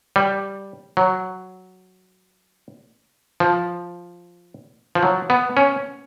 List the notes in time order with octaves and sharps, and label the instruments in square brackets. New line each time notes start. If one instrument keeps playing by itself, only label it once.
[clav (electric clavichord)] G3
F#3
F3
F3
F#3
B3
C#4